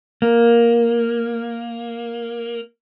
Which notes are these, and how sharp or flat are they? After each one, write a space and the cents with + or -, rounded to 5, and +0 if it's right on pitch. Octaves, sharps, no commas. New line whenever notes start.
A#3 +5